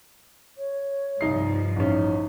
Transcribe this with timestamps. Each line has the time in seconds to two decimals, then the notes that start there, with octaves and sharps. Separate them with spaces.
0.58 C#5
1.21 C2 G2 F3 D#4 C7
1.76 A1 C#4 D#4